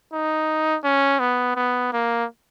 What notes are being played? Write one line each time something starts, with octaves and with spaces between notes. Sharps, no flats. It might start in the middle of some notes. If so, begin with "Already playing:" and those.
D#4
C#4
B3
B3
A#3